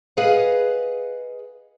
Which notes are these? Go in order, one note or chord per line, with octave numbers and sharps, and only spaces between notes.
G#4 B4 D#5 F5 F#5